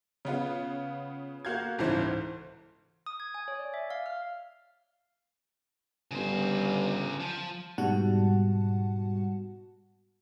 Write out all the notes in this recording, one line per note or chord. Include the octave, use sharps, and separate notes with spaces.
C#3 B3 F4
A#3 F#4 F5 G6 G#6
G1 C#2 G#2 E3 C5
D#6
G#6
G#5
C#5
D5
E5
F5
F6
G1 C#3 C5
F3
G#2 B2 G3 F#4 F#5 A5